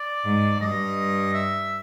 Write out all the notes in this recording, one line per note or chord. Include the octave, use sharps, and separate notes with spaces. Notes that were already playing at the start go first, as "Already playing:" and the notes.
Already playing: D5
G#2
G2 D#5
E5